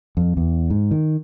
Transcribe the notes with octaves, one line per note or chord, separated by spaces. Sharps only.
F2
E2
G#2
D#3